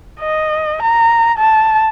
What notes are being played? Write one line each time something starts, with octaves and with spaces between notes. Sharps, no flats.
D#5
A#5
A5